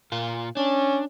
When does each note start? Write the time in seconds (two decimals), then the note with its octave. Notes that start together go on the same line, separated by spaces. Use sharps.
0.12 A#2 F4
0.57 C#4 D4